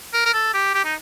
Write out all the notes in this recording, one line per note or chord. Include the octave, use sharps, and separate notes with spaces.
A#4
A#4
A4
G4
G4
D#4